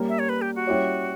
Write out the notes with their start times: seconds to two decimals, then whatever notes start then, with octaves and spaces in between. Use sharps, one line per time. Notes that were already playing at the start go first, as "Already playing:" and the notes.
Already playing: G3 A#3 C#4
0.09 E5
0.19 C#5
0.29 B4
0.42 G4
0.55 F#4
0.67 G3 C#4 E4 G4 C#5